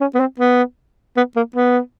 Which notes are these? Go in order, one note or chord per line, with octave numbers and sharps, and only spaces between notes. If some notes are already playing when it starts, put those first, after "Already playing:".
C#4
B3
C4
B3
B3
A#3
B3